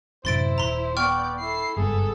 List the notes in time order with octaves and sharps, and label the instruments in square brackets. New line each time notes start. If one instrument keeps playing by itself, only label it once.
[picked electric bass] A1 F#2 C3 [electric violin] E4 [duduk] C5 [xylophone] C6 A6 D7
[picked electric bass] D#1 [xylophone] A#5 C6
[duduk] B3 [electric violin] D5 G6 [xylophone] G5 C#6 F6
[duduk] E4 [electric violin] A4 C7
[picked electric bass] F#1 G2 G#3 [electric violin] B3 A4 [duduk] G#4